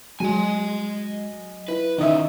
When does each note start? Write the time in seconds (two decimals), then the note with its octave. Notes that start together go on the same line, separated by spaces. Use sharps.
0.20 F#3 G#3 D#5 G#5
1.68 E4 B4
1.98 D#3 C#4 D#4 D#5 E5